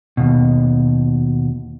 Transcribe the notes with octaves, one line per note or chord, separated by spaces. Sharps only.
D#2 B2